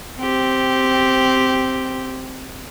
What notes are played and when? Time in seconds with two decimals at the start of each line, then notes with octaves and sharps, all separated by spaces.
0.19 C4 G4